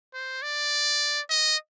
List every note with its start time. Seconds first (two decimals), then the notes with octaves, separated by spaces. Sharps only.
0.14 C5
0.42 D5
1.30 D#5